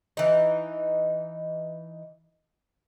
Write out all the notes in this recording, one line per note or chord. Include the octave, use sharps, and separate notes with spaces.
E3 D#4